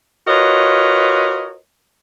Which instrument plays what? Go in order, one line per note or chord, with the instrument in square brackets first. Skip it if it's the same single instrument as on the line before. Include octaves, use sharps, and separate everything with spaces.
[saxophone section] F4 F#4 A#4 B4 C#5 D#5